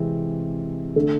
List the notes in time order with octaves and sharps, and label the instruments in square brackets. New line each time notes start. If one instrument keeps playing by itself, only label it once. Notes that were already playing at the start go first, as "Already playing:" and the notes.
Already playing: [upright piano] C3 E3 G#3 C4
D3 A3